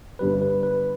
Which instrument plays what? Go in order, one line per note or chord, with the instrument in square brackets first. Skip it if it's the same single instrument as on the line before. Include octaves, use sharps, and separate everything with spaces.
[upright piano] G1 G2 G3 [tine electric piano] B4
[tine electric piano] B4
B4